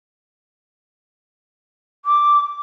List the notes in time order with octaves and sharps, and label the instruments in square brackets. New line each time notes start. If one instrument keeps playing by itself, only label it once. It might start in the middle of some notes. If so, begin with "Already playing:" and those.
[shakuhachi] D6